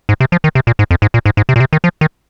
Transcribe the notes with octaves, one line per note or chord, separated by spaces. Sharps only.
G#2
C3
F3
D#3
C3
A#2
G#2
F2
G#2
A#2
G#2
G#2
C3
A#2
C3
D#3
F3
D#3